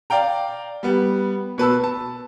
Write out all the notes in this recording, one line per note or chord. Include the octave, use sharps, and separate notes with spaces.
D5 F5 G5 A#5
G3 B3
B2 B4 A5 E6
A5